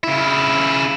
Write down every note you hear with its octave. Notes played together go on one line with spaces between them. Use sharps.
C#3 E4